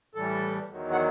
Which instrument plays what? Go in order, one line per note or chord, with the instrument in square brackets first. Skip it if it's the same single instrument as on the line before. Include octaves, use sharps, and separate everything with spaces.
[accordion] A2 E3 G3 A4
E2 D#3 F#3
F#5